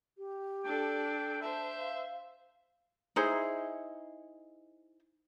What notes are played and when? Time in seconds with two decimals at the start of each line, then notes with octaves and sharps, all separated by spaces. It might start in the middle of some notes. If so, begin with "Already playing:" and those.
0.18 G4
0.65 D4 A4 G5
1.41 C5 E5 A5
1.78 F5
3.16 D#4 E4 G#4 C5